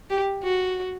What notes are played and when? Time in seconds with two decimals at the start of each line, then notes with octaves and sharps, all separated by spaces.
0.10 G4
0.43 F#4